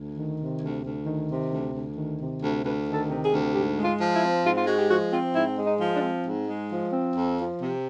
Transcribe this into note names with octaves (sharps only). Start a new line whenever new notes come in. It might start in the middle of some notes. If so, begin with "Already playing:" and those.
Already playing: D2
D#3
C3
D2
D2
D#3
C3
D2
D2
D#3
C3
D2
D2 B4
D#3
A4
C3
G#4
D2
G#2 G4
G#3
F4
F3
E4
C4
G#2 F4
F4
G#3 F#4
G4
F3 F#4
C4 F4
G#2 E4
G#3
D#4
F3
D4
C4
G#2
G#3
F3
C4
F2
F3
C3